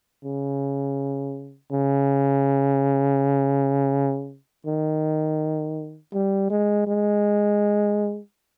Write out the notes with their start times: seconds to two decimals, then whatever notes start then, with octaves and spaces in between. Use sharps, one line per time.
0.24 C#3
1.72 C#3
4.66 D#3
6.13 G3
6.50 G#3
6.87 G#3